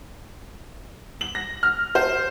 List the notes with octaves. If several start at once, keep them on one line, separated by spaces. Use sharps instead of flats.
F#7
A#6
F6
C5